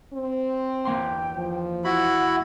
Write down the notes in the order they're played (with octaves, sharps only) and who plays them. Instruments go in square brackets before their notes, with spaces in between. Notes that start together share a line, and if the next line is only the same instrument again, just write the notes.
[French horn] C4
[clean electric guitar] E2 A#3 C6 [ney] G5
[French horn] F3
[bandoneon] E4 F#4 B5 [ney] F#5